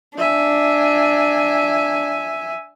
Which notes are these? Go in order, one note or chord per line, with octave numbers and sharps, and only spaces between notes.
D4 E5 G#5